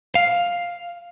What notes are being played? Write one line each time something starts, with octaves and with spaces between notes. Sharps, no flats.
F5